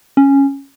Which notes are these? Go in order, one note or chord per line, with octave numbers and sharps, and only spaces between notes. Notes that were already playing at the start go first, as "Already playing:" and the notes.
C#4